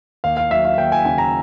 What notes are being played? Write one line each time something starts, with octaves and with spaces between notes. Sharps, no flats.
D#2 F5
F5
F#3 E5
F5
D#2 G5
G#5
C#3 G#5
A#5